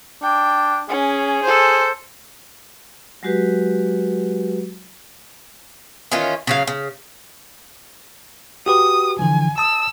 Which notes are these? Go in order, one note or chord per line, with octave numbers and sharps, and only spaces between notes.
D4 G5
C#4 G#4
A4 C5
F#3 G#3 F#4 G4 B4
D#3 E3 C#4 F4
C#3 F#3 F5
C#3
F#4 G4 B4 D#6
D3 E3 F3 G#5
A5 D#6 E6